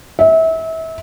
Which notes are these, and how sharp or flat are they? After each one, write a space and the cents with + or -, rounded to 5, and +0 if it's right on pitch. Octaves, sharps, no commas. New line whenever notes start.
E5 -30